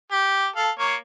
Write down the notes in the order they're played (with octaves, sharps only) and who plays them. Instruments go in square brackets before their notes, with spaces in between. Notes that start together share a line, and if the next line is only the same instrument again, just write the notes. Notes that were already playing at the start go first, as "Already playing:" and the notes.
[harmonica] G4
A4 F5
A#3 C#5